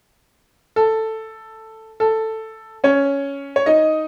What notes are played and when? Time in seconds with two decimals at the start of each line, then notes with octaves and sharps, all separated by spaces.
0.76 A4
2.00 A4
2.84 C#4 C#5
3.56 C#5
3.66 D#4 D#5